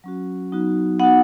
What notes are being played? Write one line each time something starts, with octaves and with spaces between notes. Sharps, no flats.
F#3 C#4 F#4
F#3 B3 D#4 F#4
B3 D#4 F#4 F#5